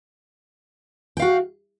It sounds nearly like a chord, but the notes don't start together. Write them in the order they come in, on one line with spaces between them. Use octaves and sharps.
G5 F5 F#4